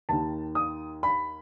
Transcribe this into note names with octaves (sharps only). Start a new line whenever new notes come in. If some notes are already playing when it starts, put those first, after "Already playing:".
D#2 D#3 A5
D#6
B5